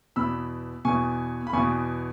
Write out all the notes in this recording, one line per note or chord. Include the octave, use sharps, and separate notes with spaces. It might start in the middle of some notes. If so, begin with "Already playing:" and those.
E2 B2 B5 E6
E2 B2 G#5 C#6
B5
E2 B2 G#5 C#6